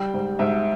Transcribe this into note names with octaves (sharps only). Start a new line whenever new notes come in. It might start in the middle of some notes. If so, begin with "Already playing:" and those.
Already playing: G3 G5
G#2
G#2 E5